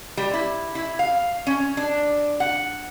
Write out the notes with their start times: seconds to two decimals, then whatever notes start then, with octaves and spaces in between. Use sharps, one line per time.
0.17 G3
0.34 E4
0.75 E4
0.99 F5
1.47 C#4
1.77 D4
2.40 F#5